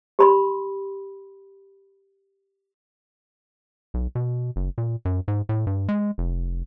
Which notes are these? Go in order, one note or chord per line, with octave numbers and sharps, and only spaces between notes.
G4 B5 C6
B1
B2
F#1
A#2
F#2
G#2
A2
G2
G#3
F1